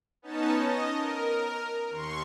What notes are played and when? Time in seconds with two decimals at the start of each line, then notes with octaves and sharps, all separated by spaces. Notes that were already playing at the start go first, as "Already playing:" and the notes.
0.22 B3 C#4 D#4 A5
0.57 D#5
0.93 A#4
1.90 D#2 C6 C#6